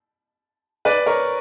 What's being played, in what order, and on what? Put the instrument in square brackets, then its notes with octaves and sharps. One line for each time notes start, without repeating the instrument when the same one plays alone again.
[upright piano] B4 D5
A#4 C#5